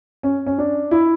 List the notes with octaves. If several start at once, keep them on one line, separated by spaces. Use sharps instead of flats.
C#4
C#4
D4
E4